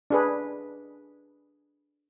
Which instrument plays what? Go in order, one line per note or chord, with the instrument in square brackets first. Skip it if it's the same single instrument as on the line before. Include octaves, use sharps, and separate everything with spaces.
[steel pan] D4 G#4 B4